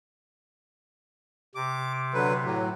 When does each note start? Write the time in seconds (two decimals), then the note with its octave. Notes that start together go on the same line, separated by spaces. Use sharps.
1.55 C3 D6
2.14 D3 F#3 B4
2.45 A2 F#3